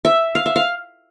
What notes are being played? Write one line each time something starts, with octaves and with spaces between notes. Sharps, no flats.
E5
F5
E5
F5